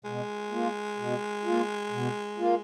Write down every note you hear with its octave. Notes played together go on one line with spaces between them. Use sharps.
B2 G#3
A#3 F4
B2
A#3 F4
B2
A#3 F4